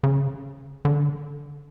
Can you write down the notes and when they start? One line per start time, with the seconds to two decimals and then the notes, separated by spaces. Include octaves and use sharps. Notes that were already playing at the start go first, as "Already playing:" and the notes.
0.03 C#3
0.85 D3